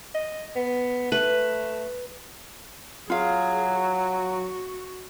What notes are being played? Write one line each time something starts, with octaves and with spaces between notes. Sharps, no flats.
D#5
B3
A3 B4
F#3 F4 G#4 F5
F#4